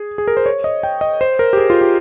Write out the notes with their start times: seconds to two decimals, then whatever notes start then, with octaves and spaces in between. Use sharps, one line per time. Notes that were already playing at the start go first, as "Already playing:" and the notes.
Already playing: G#4
0.18 G#4
0.28 A#4
0.37 C5
0.46 C#5
0.64 D#5
0.83 G5
1.01 D#5
1.21 C5
1.39 A#4
1.53 G4
1.57 G#4
1.70 F4
1.81 G4